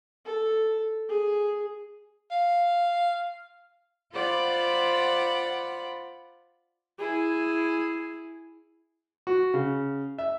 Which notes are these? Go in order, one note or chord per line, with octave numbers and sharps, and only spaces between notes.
A4
G#4
F5
F4 C5 D5 F#5 B5
E4 G#4
F#4
C#3
E5